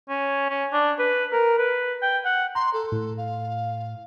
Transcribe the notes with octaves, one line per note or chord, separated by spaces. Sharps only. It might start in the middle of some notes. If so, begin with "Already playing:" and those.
C#4
C#4
D4
B4
A#4
B4
G5
F#5
A#5 C6
A4
A2
F5